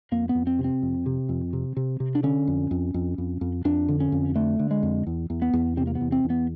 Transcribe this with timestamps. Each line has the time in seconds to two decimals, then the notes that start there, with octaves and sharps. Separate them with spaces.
0.12 F2 A#3
0.29 B3
0.35 F2
0.47 C4
0.59 C3
0.64 C4
0.82 F2
1.06 C3
1.29 F2
1.53 C3
1.77 C3
2.00 C3
2.15 D4
2.23 D3 C#4
2.48 F2
2.71 F2
2.94 F2
3.18 F2
3.41 F2
3.65 F2 D4
3.89 D3
4.00 C#4
4.12 F2
4.35 D3 A3
4.59 D3
4.71 G#3
4.83 F2
5.07 E2
5.30 E2
5.42 B3
5.53 E2
5.77 C3 C4
5.87 A#3
5.95 B3
6.01 E2
6.12 C4
6.24 E2
6.30 B3